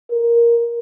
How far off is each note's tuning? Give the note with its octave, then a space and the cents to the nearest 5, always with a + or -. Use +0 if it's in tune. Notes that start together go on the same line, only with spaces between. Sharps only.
A#4 +5